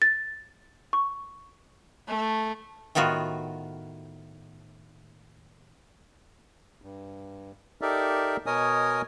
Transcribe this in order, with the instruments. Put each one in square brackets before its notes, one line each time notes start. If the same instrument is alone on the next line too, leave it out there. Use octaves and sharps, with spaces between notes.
[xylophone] A6
C#6
[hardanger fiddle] A3
[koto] A2 D#3 B3 F4 F#4
[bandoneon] G2
D#4 G4 A4 A#4 D5 E5
B2 A#4 C#5 D#5 G#5 D#6